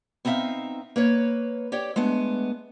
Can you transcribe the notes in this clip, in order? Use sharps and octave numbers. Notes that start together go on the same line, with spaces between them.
B3 C4 D#4 E4 E5 F5
A#3 B4 C#5
G4 C#5 D5 G5
G#3 A3 B3 D4